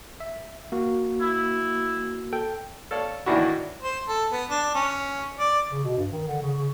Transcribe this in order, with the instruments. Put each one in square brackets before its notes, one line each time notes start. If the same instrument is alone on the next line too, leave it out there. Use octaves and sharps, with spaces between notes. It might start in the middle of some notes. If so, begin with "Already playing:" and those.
[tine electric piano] E5
A#3 F#4
[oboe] E4
[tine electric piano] A4 G5
[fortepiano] A4 C#5 D5 F5
A2 D#3 E3 D4 E4 F#4
[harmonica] C5
A4
B3
D4
C#4
D5
[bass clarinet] C#3
B2
G2
D#3
D3
C#3
C#3